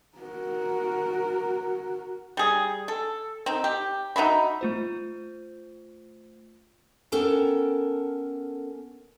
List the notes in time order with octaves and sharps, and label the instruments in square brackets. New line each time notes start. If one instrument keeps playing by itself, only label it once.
[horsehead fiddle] F#4 A#4
[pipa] G3 G#4
A4
C4 D#4
G4
D#4 F#4 E5 B5
[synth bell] A3 F4 C5
[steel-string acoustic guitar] B3 C#4 A4 A#4 G5 A5